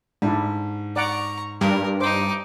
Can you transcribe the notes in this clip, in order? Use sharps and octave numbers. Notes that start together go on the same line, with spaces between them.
G#2 D4 E4
D5 F#5 A#5 C#6 D6
G2 A#4
D#4 C5 D6